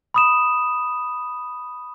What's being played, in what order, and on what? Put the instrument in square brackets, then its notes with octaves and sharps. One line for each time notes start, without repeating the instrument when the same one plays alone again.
[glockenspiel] B5 D#6 E7